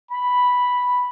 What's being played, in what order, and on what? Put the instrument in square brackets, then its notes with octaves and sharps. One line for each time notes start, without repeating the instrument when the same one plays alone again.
[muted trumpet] B5